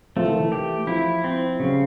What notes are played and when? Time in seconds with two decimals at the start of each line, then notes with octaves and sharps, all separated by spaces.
0.16 F3 A3
0.24 E3
0.31 D#3
0.40 E3
0.52 G4
0.87 F3 E4
1.24 C4
1.59 C#3 F#3
1.68 G3